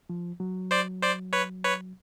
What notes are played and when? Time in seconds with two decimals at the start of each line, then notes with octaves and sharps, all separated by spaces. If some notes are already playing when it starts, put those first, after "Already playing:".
0.10 F3
0.40 F#3
0.71 C5 D5
1.02 C5 D5
1.33 B4 C#5
1.64 B4 C#5